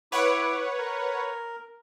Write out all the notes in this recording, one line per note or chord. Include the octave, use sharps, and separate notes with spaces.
E4 B4 C#5 F#5 D6
A#4